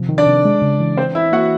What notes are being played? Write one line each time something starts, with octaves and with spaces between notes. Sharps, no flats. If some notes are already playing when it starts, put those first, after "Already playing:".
Already playing: C3 F3
D#3
D4 D5
C3
G#3
C#3
E3
E3 C4 C5
E3 E4 E5
A#3 F#4 F#5